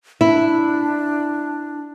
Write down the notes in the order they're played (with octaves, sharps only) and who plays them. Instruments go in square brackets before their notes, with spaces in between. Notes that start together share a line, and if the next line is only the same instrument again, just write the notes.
[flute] D4 [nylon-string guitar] E4